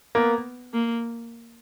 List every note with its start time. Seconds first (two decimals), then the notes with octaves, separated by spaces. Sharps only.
0.15 A#3 B3
0.73 A#3